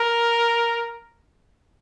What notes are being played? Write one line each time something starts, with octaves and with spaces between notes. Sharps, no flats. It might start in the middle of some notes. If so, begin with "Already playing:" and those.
Already playing: A#4